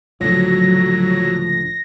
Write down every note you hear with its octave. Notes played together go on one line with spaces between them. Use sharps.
C#2 A2 D3 F3 F#3 A#6